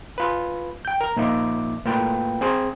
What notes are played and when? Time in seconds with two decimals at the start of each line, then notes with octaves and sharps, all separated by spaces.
0.18 F4 B4
0.85 G5 G6
1.01 A#4
1.16 A#2 F3 A#3 D#4 E5 D6
1.85 A2 A#3 F4 B4 G5
2.41 C4 G#4 C5